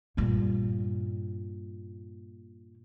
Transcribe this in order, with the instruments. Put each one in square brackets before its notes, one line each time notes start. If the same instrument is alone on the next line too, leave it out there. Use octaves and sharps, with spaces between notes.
[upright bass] G2 A#2